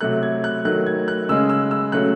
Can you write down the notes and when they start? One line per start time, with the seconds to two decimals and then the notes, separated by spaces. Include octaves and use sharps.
0.01 C3 F#3 A3 F#6
0.23 G#6
0.44 F#6
0.65 D#3 F#3 A3 F#6
0.87 G#6
1.08 F#6
1.29 C#3 G#3 E6
1.49 E6
1.71 E6
1.92 C#3 F#3 A3 F#6